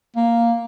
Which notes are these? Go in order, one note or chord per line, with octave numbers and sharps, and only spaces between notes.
A#3